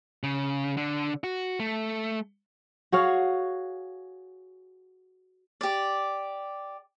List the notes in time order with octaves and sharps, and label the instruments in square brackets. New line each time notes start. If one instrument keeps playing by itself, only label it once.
[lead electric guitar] C#3
D3
F#4
A3
[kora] F#4 G#4 C#5 F5
[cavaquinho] G4 D5